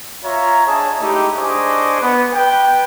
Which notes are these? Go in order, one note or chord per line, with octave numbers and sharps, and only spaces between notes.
F4 C#5 E5 A#5
D4 G#4 C#5 D#5 E5 A5
G#3 A3 D#4 E4 G4
D4 G#4 C5 D#5 C#6 D6
B3
B4 G5